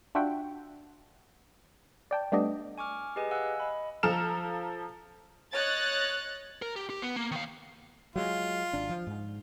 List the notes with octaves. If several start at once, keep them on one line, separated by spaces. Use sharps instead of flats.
D4 F4 F#4 E5 F#5 G5
D5 G5 A5
G3 A3 B3 D4 D5 D#5
G#5 C#6 D6 F6
G4 G#4 B4 D#5 G#5
F5 F#5 G#5 E6 F#6
D#5 B5
F3 A4 A#5 F6 E7
C#5 D#5 F#6 A6
A#4
G4
G4
B3
A#3
D#3 F5
F#3 G#3 F4
G#1 D4
F3
G#2